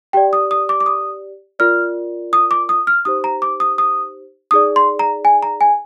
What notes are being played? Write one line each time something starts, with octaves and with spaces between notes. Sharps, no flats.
G4 D5 G5
D#6
D#6
D6
D6
D#6
F4 A#4 D5 F6
D#6
D6
D#6
F6
D#4 G4 C5 D#6
A#5
D6
D#6
D#6
D#4 G#4 D5 D#6
C6
A#5
G#5
A#5
G#5